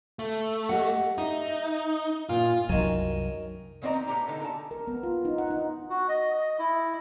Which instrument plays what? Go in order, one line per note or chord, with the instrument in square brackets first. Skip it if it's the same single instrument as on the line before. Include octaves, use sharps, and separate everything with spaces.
[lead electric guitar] A3
[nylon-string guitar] G4 D#5 F#5
[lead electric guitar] D#4 [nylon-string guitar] E5
[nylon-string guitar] A#2 [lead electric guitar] F4
[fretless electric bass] C2 F#2 F#3 [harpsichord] D#3 G#5
[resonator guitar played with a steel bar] D#3 B3 C4 D5 D#5 A#5
D#4
A2 B3 G4 A#5
D3 B3 D#4
A#4 A5
[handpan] A#4
B3
F4
D#4
F#5
D#4
[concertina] F#4
D#5
D#5
E4